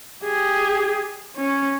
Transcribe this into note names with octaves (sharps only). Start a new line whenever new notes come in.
G4 G#4
C#4